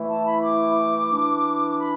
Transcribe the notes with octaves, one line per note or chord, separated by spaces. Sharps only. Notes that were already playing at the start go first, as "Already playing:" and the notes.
Already playing: E3 A3 E4
A5
B5
D6
E3 D4
D6
B5